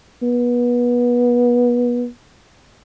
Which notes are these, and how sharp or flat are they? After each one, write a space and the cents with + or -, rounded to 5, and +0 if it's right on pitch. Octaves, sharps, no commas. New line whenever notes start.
B3 -25